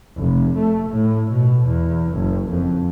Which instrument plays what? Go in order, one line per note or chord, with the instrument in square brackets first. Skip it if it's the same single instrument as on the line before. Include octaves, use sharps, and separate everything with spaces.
[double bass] F1
A3
A2
B2
E2
F#1
F2